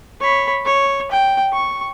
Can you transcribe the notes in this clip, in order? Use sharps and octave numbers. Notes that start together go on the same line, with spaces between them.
C#5 B5
C#5
G5
C#6